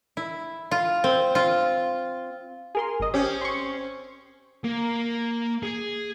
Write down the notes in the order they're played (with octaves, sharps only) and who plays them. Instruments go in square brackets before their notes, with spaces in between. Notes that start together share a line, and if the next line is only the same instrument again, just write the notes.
[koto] E4
F4
C4
F4
[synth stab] G#4 A#4 C6
G#1 D#5
[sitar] C4 C#4 [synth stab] G4
[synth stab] C6 C#6
[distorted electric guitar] A#3
G#4